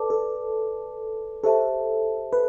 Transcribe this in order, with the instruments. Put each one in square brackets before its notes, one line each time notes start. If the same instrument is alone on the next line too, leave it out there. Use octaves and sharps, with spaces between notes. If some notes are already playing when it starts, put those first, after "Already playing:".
Already playing: [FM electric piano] A4 [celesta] B4 D5 A5 D6
[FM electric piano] A4
[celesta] G4 C5 E5 A5 [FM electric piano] A4
[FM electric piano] B4